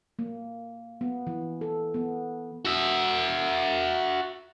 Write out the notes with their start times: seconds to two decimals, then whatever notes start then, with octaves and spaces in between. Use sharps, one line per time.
0.19 A#3
1.01 B3
1.27 E3
1.61 A4
1.94 B3
2.65 F#4 E5